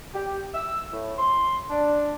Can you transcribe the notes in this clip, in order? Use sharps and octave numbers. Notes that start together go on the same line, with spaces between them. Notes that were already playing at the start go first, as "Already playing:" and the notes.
G4
E6
A2
C6
D4